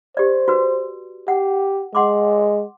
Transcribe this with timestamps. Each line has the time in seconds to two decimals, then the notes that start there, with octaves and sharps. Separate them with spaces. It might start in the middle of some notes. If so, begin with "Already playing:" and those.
0.17 G4 C5 D5
0.48 F#4 B4
1.28 G4 F#5
1.95 G#3 F#5 C6 D6